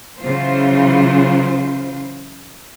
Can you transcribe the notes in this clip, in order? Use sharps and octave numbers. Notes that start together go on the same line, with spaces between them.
C#3 E3 F#3 F4 C5